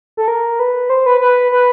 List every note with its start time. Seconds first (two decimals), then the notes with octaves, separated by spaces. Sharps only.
0.17 A4
0.28 A#4
0.60 B4
0.90 C5
1.06 B4
1.21 B4
1.52 B4